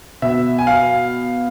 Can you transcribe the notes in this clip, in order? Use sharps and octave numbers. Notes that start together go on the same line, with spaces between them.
B2 E5
G#5
F5